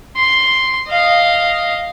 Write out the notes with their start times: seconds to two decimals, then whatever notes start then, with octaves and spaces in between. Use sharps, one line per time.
0.17 C6
0.88 D#5 F5